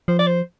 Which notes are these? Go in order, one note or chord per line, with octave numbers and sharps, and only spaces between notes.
F3 C5
D5
C5